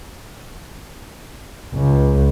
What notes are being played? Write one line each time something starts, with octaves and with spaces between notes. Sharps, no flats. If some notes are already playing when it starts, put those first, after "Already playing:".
C#2